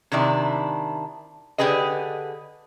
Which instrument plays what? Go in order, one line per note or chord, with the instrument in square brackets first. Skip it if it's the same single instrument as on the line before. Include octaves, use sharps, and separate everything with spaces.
[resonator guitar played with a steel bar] C3 D#3 D4 E4
D3 G4 G#4 B4 D#5